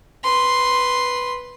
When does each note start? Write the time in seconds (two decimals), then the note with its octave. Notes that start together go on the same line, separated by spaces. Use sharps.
0.24 B4 C6